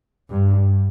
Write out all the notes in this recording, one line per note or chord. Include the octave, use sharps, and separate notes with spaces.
G2